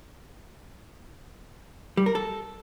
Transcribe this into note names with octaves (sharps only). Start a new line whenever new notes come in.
G3
A#4
A4